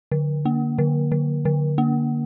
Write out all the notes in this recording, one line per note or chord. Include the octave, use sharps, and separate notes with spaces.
D3
A#3
D3
D3
D3
A#3